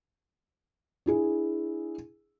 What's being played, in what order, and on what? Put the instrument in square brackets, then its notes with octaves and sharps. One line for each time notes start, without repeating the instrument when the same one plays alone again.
[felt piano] D4 E4 G#4